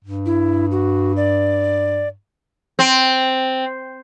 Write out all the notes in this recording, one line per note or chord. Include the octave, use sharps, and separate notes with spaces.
G2
E4
F#4
D5
C4